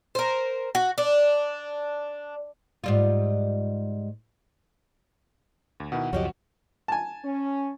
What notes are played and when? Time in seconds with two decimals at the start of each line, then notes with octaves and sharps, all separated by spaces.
0.15 A#4 C5
0.75 F#4
0.98 D4
2.84 G#2 G3 F4
5.80 D2
5.92 B2 D#3 E4 F#5
6.13 C#2 F#2 F3 C#4 F#4 G4 D#5
6.88 G#5 A5
7.25 C#4